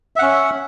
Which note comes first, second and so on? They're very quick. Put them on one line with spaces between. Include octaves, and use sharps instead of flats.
E5 F#5 C#4